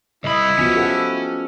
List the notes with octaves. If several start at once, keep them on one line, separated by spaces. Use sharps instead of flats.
C2 E4 D#5 B5
F3 B3 C#4 F#4
G4 A4 F#5